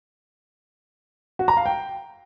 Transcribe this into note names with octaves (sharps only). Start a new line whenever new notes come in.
F#4
A#5
F5
G5